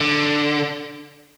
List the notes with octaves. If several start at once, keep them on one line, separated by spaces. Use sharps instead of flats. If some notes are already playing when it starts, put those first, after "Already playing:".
D3